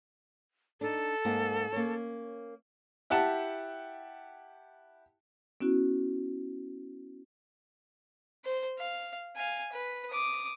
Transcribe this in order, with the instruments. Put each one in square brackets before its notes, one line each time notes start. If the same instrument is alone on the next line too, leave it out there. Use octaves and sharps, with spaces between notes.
[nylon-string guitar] D4 D#4 [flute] A4
[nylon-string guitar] G#2 A#3 C4
A#3 C#4 C#5
[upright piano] E4 G4 F#5 G5 A5
[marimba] B3 C#4 E4 F#4
[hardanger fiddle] C5
F5
F5 G#5
B4
D6 D#6